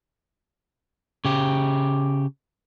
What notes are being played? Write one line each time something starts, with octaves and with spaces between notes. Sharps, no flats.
C#3 G4